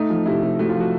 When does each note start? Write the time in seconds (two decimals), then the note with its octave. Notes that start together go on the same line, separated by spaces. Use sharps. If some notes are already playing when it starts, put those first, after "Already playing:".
Already playing: A3 D#4
0.10 F3
0.26 C3 E4
0.42 C3
0.59 A3 F#4
0.69 F4
0.75 F3 F#4